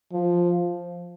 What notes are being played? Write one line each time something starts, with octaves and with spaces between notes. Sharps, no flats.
F3